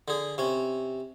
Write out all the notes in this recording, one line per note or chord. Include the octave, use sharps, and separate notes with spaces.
D3 G#4
C3 C#4